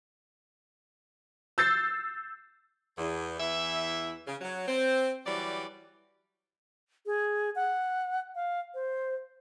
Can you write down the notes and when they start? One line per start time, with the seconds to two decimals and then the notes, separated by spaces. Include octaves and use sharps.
1.58 E6 G6 A6 C7
2.98 E2
3.40 E2 E3 E5
4.27 C#3
4.41 F#3
4.68 C4
5.26 E3 F#3 G3 D5
7.06 G#4
7.55 F#5
8.35 F5
8.74 C5